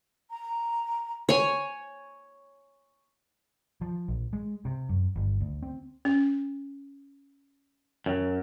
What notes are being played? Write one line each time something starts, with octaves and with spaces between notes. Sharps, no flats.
A#5
C#5 G#5
F3
A#1
G#3
C3
F#2
G1
D2
C4
C#4
F#2